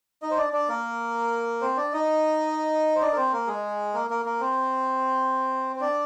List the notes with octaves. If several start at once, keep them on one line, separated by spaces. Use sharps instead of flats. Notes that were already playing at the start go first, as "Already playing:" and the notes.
D#4 D#5
C5
D4 D5
D4 D5
A#3 A#4
C4 C5
D4 D5
D#4 D#5
C5
D4 D5
A#4
C4 C5
A#3 A#4
G#3 G#4
A#3 A#4
A#3 A#4
A#3 A#4
C4 C5
C5
D4 D5